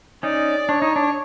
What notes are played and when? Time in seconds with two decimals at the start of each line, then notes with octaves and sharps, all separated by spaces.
0.23 C#4 D#4 D5
0.69 D4 C#5
0.82 D#4
0.96 D4